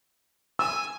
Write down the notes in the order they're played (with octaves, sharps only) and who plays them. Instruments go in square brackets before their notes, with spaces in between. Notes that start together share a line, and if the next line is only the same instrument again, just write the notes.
[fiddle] G#5 [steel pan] E6